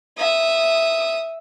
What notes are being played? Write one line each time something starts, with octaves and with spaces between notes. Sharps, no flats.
E5 D#6